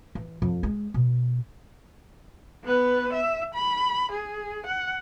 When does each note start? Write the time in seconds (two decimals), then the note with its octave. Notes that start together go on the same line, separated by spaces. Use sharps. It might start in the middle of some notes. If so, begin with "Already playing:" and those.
0.15 E3
0.42 F2
0.63 G#3
0.94 B2
2.64 B3 B4
3.13 E5
3.54 B5
4.11 G#4
4.66 F#5